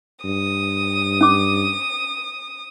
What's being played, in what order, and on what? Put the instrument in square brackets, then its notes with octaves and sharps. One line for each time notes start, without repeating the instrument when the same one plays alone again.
[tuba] G2 [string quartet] D#6
[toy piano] C#4 D6